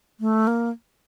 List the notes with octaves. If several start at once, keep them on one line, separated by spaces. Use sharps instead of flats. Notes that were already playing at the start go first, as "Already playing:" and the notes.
A3
A#3